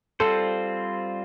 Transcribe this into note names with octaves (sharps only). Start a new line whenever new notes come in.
G3 C4 F4 A4 C5